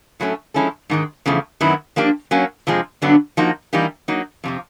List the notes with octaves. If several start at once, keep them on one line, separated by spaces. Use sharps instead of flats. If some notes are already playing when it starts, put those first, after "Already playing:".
A2 F#3 A3 C#4
F3 G#3 C#4 E4 A4
G#2 D#3 G#3
E2 C#3 F3 A3
F#2 D#3 F#3 B3 E4
F3 A#3 D4 G4
F#3 A#3 C#4
F2 C3 F3 G#3
G2 D3 F#3 B3 D4
F3 A#3 D#4 F#4
E3 G3 A#3 D#4 G4
F#3 A#3 D#4
F2 C3 F3